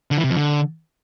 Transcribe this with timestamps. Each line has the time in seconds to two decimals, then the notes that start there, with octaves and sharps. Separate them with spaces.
0.11 D3
0.17 E3
0.24 C3
0.30 F2
0.37 D3